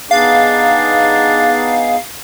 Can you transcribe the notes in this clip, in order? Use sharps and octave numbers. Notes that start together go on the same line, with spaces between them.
B3 D4 D#4 G#4 F5